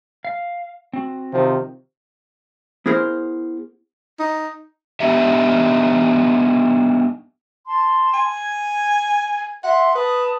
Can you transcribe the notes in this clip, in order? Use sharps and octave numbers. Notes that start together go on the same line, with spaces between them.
F5
C4 F#4
C3 D#3 F3
B3 E4 G#4 A#4 C5
D#4
B3 D4 D#4 G4 E5
A5 C6
G#5
G#6
E5 F#5 C6
B4 A5 D#6